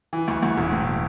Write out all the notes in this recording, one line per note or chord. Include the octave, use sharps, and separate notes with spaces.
E3
D2
D2
E1
A2